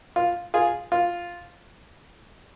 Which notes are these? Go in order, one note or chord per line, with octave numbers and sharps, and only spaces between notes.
F4
F4 G#4
F4